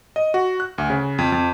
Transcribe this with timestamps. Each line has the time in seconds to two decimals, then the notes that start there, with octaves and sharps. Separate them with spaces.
0.16 D#5
0.34 F#4
0.60 F#6
0.78 D2
0.90 C#3
1.18 F2
1.32 F2